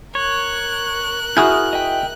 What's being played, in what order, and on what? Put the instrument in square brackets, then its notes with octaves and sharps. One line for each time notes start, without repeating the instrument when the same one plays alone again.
[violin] A#4 F#6 [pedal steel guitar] C#5
[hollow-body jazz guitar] E4 [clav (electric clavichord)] F#4 G#4 G#5 [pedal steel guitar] D#6 F6 G6
[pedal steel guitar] D#5 E5 G5